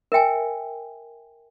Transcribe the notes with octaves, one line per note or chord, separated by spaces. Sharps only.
A#4 E5 G5 G#5